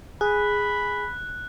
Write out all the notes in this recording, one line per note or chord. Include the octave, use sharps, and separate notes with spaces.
G#4 B5 F#6